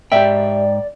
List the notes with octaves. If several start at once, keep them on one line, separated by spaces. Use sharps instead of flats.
G#2 G4 D5 E5 G5